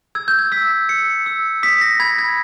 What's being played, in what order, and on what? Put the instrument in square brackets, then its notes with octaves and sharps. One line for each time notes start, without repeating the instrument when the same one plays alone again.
[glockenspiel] E6 G#6
G6
G#6
E6 B6
E6 C#7
E6
D#6 B6
A#6
B5 G#6
G#6